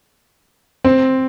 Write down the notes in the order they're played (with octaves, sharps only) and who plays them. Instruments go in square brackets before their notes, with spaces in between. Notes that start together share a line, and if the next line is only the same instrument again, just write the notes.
[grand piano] C4